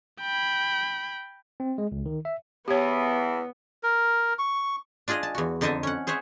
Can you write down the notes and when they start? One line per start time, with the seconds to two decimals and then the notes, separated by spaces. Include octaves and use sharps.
0.21 G5 B5
1.60 C4
1.78 G#3
1.92 C#2
2.06 D#3
2.25 E5
2.68 E2 E3 B3 G4 C#5
3.83 A#4
4.39 C#6
5.08 D4 F4 G#4 D#5 F5
5.23 A5
5.35 E2 F#4
5.61 F2 D3 D#4 D#5 E5 A5
5.83 C#4 F#5
6.07 G#4 C5 C#5 E5 F#5